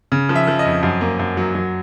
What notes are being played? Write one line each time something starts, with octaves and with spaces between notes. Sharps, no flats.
C#3
F3
E5
F3
D#5
F2
F#2
A#3
F#2
F#3
F#3